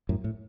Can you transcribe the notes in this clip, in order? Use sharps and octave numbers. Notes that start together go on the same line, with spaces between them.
F#2 A2
A2